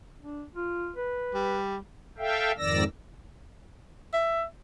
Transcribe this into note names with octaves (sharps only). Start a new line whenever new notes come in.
D4
F4
B4
G3
A4 E5 F5 G5
F2 G#2 D#3 D5 E6 A#6
E5